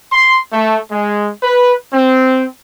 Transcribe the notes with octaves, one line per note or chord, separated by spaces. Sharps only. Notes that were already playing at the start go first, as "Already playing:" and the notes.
C6
A3
G#3
B4
C4